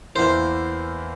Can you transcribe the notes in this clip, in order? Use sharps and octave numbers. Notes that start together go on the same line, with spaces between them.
E2 E3 A#3 E4 A#4 C5